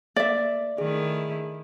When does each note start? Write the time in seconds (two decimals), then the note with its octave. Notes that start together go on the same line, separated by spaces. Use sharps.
0.16 A#3 D5 E5
0.78 D#3 A3 E4 G#4